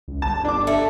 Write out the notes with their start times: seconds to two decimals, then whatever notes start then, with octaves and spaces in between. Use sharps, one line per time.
0.08 C#2
0.22 G1 A5
0.45 D4 D6
0.67 A3